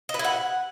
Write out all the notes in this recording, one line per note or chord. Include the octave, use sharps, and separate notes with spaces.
D#5
B4
E4
F#5